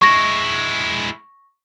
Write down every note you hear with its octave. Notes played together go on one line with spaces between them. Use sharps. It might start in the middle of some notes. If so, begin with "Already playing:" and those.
G#3 E4 C#6 A#6